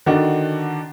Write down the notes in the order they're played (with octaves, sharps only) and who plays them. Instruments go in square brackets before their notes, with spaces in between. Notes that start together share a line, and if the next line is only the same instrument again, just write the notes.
[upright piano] D3 D#3 D4 F#4